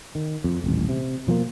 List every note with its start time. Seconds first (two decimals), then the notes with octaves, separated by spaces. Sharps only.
0.15 D#3
0.44 F2
0.64 D#1 A1
0.89 C3
1.27 B2 F3 F#3 A#3